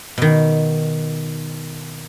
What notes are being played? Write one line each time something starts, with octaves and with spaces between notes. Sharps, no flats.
B2 D#3